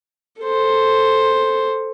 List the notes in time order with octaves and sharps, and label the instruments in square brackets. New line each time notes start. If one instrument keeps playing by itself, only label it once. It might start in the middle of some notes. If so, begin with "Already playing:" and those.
[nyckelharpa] A4 C5